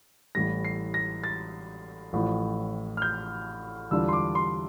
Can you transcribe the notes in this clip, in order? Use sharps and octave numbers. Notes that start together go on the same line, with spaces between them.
A1 A2 E3 G3 A#6
C7
A#6
A6
A1 A2 F3
F6
G6
E2 D3 G3 D4 F4 E6
C6
D6
C6